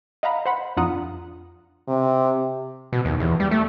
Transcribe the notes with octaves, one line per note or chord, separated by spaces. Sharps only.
D#5 F5 F#5 A#5 B5
C5 F#5 B5
F2 D4 F4 F#5 A#5 D#6
C3
B2
D#2
E2
G3
A3